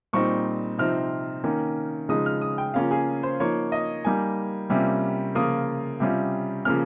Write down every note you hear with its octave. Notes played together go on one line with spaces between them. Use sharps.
A#2 G3 C4 D#4 C#6
C3 F3 C4 D#4 F6
D#3 A#3 C#4
C#3 F3 G#3 D#4 D#6
F6
D#6
G5
C#3 F3 A#3 C#4 F4 F5
G#4
C5
F3 A#3 D#4 C#5
D#5
G3 A#3 D#4 G#5
C3 G3 A#3 C#4 F4
C#3 F3 A#3 F4 D#6
C3 G3 C#4 F4
C#3 F3 A#3 C#4 F6